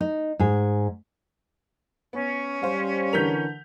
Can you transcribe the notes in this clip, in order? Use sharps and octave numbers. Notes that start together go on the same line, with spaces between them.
D#4
G#2 G#4
B3 C#4
G3 C5 F5
D3 E3 A#4 G6 B6 F7